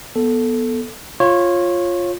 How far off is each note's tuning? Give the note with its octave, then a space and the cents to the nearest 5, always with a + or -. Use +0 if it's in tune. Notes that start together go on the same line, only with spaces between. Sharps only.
B3 -15 A4 +0
F4 +0 C#5 -20